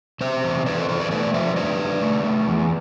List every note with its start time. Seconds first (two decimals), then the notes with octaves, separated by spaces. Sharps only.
0.21 C3 C5 E5
0.44 E2
0.66 E2 B4 D5
0.77 A4 C5
0.89 E2 A4 C5
1.00 B4 D5
1.11 A3 B4 D5
1.34 F3 C5 E5
1.56 D3 B4 D5
1.79 D3
2.02 A3
2.24 A3
2.47 E2